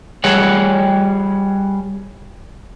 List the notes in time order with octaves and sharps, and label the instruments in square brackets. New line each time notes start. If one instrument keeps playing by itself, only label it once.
[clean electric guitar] G3 G#4 C#5 F#5